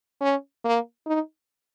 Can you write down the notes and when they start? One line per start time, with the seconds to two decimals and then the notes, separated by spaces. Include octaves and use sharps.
0.21 C#4
0.65 A#3
1.06 D#4